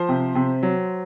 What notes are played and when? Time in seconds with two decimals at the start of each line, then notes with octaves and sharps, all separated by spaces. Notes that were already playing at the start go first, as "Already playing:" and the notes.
Already playing: F3 C5
0.09 C3
0.35 C3
0.63 F#3